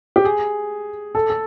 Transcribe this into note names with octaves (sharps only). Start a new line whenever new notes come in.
G4
G#4
A4
A4